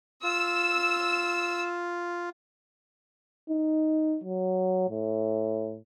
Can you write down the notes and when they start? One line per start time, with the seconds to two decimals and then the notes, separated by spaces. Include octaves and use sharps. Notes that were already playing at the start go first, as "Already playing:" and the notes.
0.23 F4 E6
3.50 D#4
4.24 F#3
4.90 A2